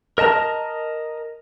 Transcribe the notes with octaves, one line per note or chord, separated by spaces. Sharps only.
A#4 D#5 A5 A#5